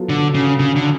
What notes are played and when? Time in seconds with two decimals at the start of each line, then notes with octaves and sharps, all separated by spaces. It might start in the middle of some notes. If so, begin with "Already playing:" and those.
Already playing: F#3 B3 F4 A4
0.09 D3
0.35 C#3
0.59 C#3
0.76 D3